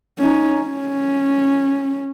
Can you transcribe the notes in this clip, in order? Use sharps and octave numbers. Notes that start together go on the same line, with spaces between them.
C#4 D#4
C#4